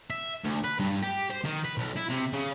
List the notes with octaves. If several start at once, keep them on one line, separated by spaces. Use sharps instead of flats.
E5
D2
B4
G2
G4
C5
D#3
B4
B1
E4
C3
C#3